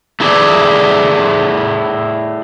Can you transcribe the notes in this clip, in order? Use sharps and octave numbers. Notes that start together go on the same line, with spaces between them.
A3 E4 G#4 D5